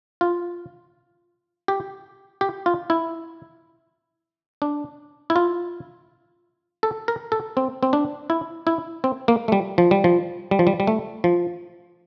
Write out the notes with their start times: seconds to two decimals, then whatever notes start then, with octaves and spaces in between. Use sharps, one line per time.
0.21 F4
1.68 G4
2.41 G4
2.66 F4
2.90 E4
4.62 D4
5.30 E4
5.36 F4
6.83 A4
7.08 A#4
7.32 A4
7.57 C4
7.83 C4
7.93 D4
8.30 E4
8.67 E4
9.04 C4
9.28 A#3
9.48 A3
9.52 G3
9.78 F3
9.91 G3
10.04 F3
10.51 G3
10.59 F3
10.67 G3
10.80 G3
10.87 A3
11.24 F3